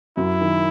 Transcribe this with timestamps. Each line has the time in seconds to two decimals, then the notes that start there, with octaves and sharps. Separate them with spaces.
0.17 F#2 F#3 E4
0.41 D#3